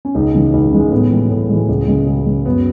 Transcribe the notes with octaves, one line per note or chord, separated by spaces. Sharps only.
C#4
C#2 D#4
C#3 E3 G#3
C#2 D#4
C#3 E3 G#3
A2 B3
E3 G#3
A2
E3 G#3
C#2
C#3 G#3
C#2
C#3 G#3
F#2 B3